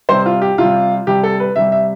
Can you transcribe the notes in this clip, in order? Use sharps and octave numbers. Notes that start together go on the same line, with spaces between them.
C3 G3 C5
F4
G4
C3 G3 F4
C3 G3 G4
A4
B4
C3 G3 E5
E5